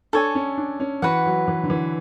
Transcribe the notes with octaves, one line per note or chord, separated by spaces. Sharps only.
D4 A4 C#5 G#5
C#4
D4
C#4
E3 F#4 B4 F#5
F#3
E3
D3
E3